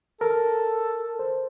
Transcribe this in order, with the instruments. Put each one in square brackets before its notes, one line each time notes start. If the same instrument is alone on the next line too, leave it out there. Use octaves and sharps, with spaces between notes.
[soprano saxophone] A4 [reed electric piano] A#4
[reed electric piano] C5